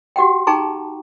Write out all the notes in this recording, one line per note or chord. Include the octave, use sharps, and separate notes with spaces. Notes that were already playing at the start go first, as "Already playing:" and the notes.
F#4 G4 F#5 G5
D#4 G#4 G5 A5 A#5 C#6